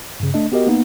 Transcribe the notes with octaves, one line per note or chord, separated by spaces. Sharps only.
G2 C#3
A3 D4 D#5
B3 F#4 G4 A#4 D#5
A#3 B3 D#4